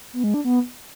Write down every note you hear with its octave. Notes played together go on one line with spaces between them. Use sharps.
B3
G#3
D4
B3